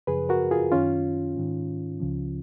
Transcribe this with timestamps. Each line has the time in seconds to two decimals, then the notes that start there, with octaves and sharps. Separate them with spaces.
0.07 F#2 C#3 F3 G#4 B4
0.29 F#4 A#4
0.51 F4 G#4
0.72 F#2 D#3 C#4 F4
1.37 G#2 D#3
2.00 C#2 C#3 F3